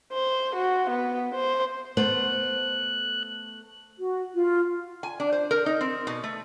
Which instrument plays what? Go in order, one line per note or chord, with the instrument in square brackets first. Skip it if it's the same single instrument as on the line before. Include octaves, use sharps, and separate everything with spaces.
[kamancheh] C5
F#4
B3
C5
[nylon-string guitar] A3 B3 C5 [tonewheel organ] F#6
[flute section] F#4
F4
[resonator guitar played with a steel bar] G#5
D4
C5
A#4
D#4
C4
B2
A3